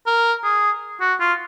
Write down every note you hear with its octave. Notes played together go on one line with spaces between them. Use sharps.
A#4
G#4
F#4
F4